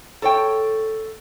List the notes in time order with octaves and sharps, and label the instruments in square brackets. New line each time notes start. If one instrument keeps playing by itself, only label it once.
[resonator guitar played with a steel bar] A4 C#5 G5